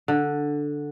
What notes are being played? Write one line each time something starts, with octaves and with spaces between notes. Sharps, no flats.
D3